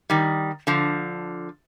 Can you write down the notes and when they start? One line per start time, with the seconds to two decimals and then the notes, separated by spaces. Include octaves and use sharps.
0.10 D#3 G3
0.67 D3 F3